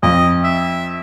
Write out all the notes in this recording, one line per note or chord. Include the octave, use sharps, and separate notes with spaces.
F2 D#5
E5